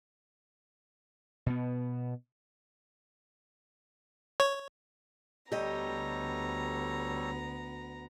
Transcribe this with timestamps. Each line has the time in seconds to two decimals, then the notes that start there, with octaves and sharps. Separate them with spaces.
1.46 B2 B3
4.40 C#5
5.52 D2 G3 B3 G4 A4 C#5 D#5 A#5